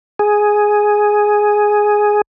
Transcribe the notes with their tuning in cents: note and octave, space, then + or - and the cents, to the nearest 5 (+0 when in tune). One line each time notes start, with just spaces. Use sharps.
G#4 +5